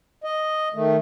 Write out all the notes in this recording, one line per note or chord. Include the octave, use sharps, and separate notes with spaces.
D#5
D#3 A3